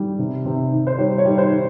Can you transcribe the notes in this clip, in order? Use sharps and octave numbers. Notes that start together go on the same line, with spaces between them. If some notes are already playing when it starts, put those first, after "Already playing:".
Already playing: G3
C3
C3
D#3
C5
G3 C#5
C#5
G3
C5
D#3